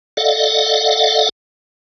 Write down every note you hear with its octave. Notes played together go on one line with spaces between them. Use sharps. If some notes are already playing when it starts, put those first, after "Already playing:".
A4 D5 D#5 F5 F#5